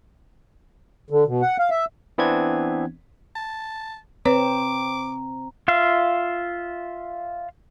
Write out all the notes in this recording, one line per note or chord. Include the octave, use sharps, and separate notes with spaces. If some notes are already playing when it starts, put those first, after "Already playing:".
D3
B2
F#5
F5
E5
E3 B3 C4 D4 G#6
A5
C4 B4 C#5 A#5 D6
F4 E5 F5